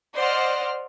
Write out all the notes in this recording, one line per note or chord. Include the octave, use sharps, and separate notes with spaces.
C5 D5 D#5 F#5 C6 F6